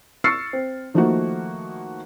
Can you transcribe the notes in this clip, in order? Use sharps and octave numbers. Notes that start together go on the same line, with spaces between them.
C#6 E6 F6 A6 C7 C#7
C4
D#3 F3 A3 A#3 D#4 F#4